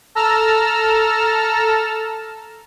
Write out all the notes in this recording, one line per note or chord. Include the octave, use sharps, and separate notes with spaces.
A4 A5 A#5 E6 F6